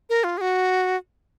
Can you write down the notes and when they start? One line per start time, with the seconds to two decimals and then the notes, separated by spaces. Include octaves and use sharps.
0.10 A#4
0.24 F4
0.38 G#4
0.41 F#4